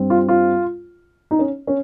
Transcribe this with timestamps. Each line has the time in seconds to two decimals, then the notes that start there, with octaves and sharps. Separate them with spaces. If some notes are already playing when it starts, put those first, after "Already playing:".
Already playing: G2 G3 C4
0.10 F4
0.28 F4
1.31 D#4
1.39 C#4
1.67 C#4